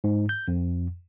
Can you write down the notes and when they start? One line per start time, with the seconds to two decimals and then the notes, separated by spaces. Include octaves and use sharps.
0.04 G#2
0.29 G6
0.48 F2